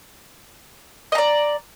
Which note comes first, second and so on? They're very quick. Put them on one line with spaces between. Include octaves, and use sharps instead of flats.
D#5 A#5 D5